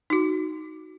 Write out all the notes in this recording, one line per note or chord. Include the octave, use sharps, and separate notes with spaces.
D#4 F#4